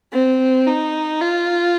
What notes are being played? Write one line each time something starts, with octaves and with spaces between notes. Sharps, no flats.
C4
D#4
F4